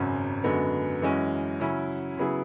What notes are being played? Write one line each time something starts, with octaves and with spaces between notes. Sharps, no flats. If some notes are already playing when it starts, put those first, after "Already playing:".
Already playing: G#1 F#2 C#3 F#3 C#4
F#2 D3 G#3 B3 F#4
F#2 E3 G#3 C#4 F#4
C#3 F#3 C#4 E4
C#3 F#3 B3 E4 G#4